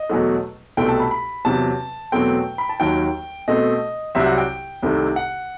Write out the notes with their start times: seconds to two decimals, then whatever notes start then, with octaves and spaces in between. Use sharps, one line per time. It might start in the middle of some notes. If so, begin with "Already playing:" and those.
Already playing: D#5
0.10 E2 B2 F#3 A3
0.77 C2 B2 A3 C4 G5
0.89 A5
1.00 B5
1.11 B5
1.45 E2 C3 F#3 A5
2.12 E2 B2 F#3 A3 C4 G5
2.58 B5
2.69 A5
2.80 D#2 D#3 F#3 G5
3.48 B2 A3 C4 D#5
4.15 C2 C3 F#3 C4 E5
4.26 F#5
4.38 G5
4.83 C2 C3 D#3 A3 C4
5.16 F#5